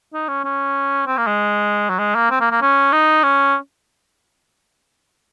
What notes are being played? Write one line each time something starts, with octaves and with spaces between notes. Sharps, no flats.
D#4
C#4
C#4
C4
A#3
G#3
F#3
G#3
A#3
C4
A#3
A#3
C#4
D#4
C#4